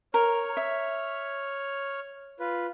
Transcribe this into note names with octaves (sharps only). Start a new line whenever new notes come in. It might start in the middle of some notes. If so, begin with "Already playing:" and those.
A#4 C#5 F6
E5
F4 B4